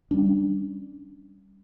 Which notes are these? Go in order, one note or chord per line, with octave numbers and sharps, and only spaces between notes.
G3 C#4 D4